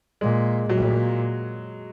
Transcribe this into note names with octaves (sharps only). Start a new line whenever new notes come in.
A#2 G#3
A#2 F#3